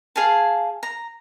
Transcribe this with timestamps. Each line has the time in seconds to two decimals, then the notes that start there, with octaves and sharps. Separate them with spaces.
0.16 G#4 F5 G#5 A5
0.83 A#5